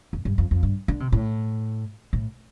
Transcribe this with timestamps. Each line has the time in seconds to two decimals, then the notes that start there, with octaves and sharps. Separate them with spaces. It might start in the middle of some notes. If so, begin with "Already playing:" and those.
0.13 F2
0.25 G2
0.38 F2
0.51 F2
0.63 G2
0.88 D3
1.00 C3
1.12 A2
2.13 A2